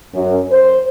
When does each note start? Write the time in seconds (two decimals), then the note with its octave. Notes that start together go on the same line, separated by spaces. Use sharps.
0.14 F#2
0.52 C5